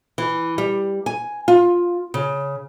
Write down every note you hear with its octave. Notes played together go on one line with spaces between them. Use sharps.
E3
G3
G#5
F4
C#3